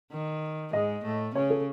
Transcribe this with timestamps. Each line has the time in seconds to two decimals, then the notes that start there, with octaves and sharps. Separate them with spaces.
0.12 D#3
0.73 G#2 G#3 D#5
1.05 A2 A3
1.35 C#3 C#4 C#5
1.50 A4